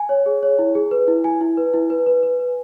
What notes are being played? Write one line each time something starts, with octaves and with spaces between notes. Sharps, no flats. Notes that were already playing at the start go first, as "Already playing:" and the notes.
Already playing: G#5
C#5
G#4
C#5
E4
G#4
B4
E4
E4 G#5
E4
B4
E4
B4
B4
B4
B4